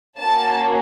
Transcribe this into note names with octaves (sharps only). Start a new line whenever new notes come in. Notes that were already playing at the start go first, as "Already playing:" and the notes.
A#3 C#4 F#4 A5